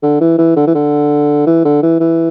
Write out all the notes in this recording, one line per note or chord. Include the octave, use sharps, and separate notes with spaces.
D3
E3
E3
D3
E3
D3
E3
D3
E3
E3